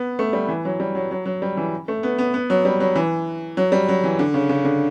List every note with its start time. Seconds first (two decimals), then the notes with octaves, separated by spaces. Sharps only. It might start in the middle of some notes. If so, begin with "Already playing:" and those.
Already playing: B3
0.19 A3
0.33 G3
0.48 E3
0.65 F#3
0.80 G3
0.95 F#3
1.11 F#3
1.26 F#3
1.42 G3
1.57 E3
1.88 A3
2.03 B3
2.18 B3
2.34 B3
2.50 F#3
2.65 G3
2.80 F#3
2.96 E3
3.57 F#3
3.72 G3
3.89 F#3
4.04 E3
4.19 D3
4.34 C#3
4.49 C#3
4.65 D3